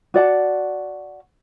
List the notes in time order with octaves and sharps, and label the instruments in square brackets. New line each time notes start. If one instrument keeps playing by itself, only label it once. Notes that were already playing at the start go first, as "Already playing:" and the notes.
[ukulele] F#4 D5 F#5 A5